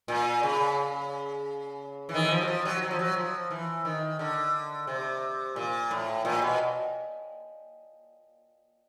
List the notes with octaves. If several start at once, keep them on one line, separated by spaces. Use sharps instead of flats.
A#2
C#3
E3
D#3
E3
F3
F#3
F3
F#3
F#3
F3
F#3
F3
E3
D#3
D3
C3
A#2
A2
A#2
B2